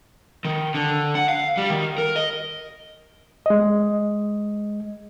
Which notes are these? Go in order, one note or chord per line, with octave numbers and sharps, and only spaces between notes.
D#3
D3
F#5
F5
G3
D#3
A#4
D#5
G#3 D#5